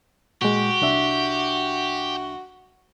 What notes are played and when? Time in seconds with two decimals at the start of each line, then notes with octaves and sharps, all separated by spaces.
0.42 A#2 G#3 F#4 G4
0.81 C2 D4 E5